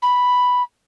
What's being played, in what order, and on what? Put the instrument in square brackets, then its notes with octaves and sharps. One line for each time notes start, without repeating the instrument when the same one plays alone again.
[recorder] B5